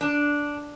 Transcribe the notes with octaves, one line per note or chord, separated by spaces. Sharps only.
D4